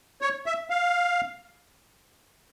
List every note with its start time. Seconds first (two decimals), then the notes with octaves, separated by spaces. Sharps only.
0.22 C#5
0.46 E5
0.70 F5